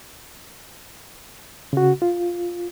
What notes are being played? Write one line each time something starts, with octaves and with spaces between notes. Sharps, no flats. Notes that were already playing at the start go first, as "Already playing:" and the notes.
C#3 F#4
F4